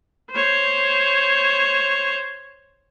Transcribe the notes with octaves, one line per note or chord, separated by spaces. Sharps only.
C5 C#5